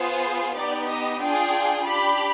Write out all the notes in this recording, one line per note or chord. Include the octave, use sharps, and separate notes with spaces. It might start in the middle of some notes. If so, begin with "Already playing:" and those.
Already playing: B3 F4 G#4 C5
B3 D#4 G4 D5
D#5
D4 F4 G#4 G5
D4 G4 B5